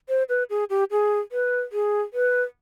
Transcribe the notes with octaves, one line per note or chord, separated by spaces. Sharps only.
C5
B4
G#4
G4
G#4
B4
G#4
B4